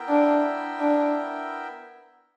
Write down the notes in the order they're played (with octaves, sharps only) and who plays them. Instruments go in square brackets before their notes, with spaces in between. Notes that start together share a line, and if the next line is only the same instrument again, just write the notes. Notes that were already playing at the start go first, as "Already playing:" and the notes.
Already playing: [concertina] B3 E4 A#4 E5 G5
[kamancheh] D4
D4